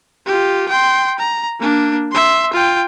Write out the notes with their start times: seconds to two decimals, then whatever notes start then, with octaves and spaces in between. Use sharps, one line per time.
0.26 F4 G4
0.69 G5 C6
1.18 A#5
1.60 A#3 D4
2.12 E5 C6
2.53 F4 G5